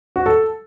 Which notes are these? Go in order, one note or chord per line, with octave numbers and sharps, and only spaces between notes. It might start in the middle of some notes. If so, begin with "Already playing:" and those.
F#4
A4